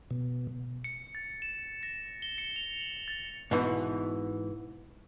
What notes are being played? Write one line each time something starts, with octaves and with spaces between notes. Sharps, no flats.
B2
C#7
A6
E7
A#6
G7
C#7
F7
F#7
A6
G#2 B2 E3